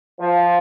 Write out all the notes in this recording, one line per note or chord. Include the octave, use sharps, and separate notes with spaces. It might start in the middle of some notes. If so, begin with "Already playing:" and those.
F3